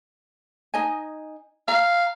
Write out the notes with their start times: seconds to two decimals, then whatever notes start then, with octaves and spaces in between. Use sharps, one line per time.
0.74 D#4 D#5 G#5
1.68 F5 A#5